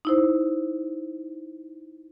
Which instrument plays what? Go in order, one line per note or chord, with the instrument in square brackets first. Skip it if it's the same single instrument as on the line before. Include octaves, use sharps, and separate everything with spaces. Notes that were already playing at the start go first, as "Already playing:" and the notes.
[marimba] D#4 E4 C5